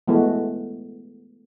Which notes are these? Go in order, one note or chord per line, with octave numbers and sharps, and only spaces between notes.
E3 G#3 A3 B3 F#4